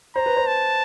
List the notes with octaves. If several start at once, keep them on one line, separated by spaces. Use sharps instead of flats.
C5 A#5
B4
C5
A5